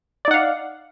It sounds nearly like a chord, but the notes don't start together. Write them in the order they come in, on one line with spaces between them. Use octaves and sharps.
D5 D#4 F#5 F5